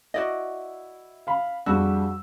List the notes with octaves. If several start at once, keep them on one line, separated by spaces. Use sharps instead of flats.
E4 F#4 D5 D#5
F5 B5
F2 G3 D4 F#4 G#4 E6